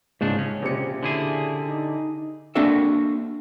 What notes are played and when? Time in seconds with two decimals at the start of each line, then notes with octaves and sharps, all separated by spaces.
0.21 C#2 G#2 C#3 D4
0.39 C#3 C#4
0.62 A#1 C3 C#7
1.03 D3 E4 G#4
1.68 D#4
2.55 A#3 C4 D4 F#4 A4 E5